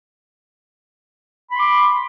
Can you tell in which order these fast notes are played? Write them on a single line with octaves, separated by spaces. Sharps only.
B5 C6 D6